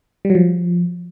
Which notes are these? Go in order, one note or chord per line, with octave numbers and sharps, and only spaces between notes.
G3
F#3
F3